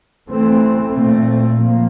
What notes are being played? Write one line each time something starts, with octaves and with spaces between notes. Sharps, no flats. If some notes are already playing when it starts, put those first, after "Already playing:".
E3 A3 C4
A#2 A3 C4
A#2 F3 A#3